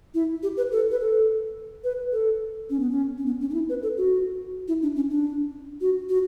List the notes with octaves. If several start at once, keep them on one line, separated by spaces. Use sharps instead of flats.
E4
G4
B4
A4
B4
A4
B4
A4
C#4
B3
C#4
C#4
B3
C#4
D4
E4
B4
A4
F#4
E4
D4
C#4
D4
F#4
F#4